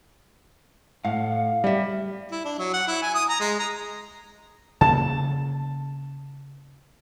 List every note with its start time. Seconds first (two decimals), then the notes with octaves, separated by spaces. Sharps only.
1.05 A2 F5 F#5
1.64 G3 D5 E5
2.31 E4
2.45 D4
2.58 F#3
2.74 F#5
2.88 E4
3.02 G#5
3.14 D#6
3.29 A#5
3.40 G#3
3.59 A#5
4.81 C#3 A#3 A5